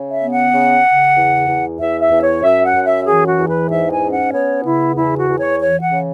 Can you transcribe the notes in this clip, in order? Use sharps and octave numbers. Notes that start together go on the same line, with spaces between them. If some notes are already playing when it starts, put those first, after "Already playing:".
Already playing: C#3
E5
B3
F#5
C#3
C#3
E2
E2
E2 E5
E5
E2
C#5
F#2 E5
F#5
F#2
E5
E3 G#4
F#4
E2
B4
G#2 E5
G#5
C#4
F#5
B3 C#5
C#3 E4
E2 E4
F#4
E2
C#5
E3 C#5
F#5
C#3